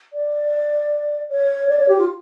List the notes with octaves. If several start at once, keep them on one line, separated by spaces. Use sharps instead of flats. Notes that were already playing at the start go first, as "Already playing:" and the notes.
D5
C#5
D5
C#5
G4
F4